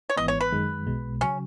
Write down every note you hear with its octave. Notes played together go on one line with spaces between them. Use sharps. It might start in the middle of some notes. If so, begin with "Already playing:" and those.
C#5
G#1 G#2 E3 B3 D#5
C#5
B4
F#2 D#3 G#3
B1 B2 G#3
C#3 F#3 C#4